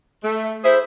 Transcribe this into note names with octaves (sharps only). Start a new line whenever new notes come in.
A3
E4 G#4 C5 E5